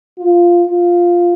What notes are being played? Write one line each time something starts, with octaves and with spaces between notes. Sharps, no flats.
F4
F4